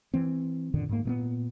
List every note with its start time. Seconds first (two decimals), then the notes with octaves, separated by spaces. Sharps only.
0.14 E3 C4
0.74 F#2 A#2 D3 D#3
0.89 G#2 A#3
1.05 A#2 A#3 B3